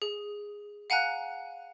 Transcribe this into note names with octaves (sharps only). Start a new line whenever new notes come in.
G#4
F5 F#5 G#5 A#5 F#6